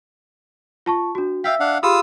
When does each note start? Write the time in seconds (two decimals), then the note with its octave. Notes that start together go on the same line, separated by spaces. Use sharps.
0.86 F4 A5 C#6
1.15 D4 F#4
1.44 E5 F5 G5 E6 B6
1.60 D4 F5 F#5
1.83 F4 G4 G#4 B5 D#6 E6